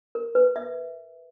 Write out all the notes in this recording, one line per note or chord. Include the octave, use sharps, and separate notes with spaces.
A#4
B4
E5